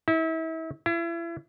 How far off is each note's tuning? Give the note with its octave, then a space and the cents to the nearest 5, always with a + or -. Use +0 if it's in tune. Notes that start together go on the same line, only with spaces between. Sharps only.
E4 -35
E4 +35